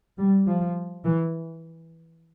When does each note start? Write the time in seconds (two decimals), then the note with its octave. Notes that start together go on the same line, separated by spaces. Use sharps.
0.18 G3
0.46 F3
1.04 E3